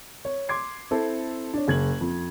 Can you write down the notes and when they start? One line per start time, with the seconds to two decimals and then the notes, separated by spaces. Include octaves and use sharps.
0.25 C#5
0.49 C6 D6 G#6 C7
0.91 C4 E4 A4
1.54 D4 C#5
1.68 F#1 G#6 F#7
2.01 F2